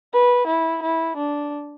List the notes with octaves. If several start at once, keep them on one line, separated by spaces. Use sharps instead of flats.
B4
E4
E4
D4